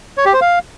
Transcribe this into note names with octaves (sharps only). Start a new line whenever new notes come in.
C#5
G4
C5
F5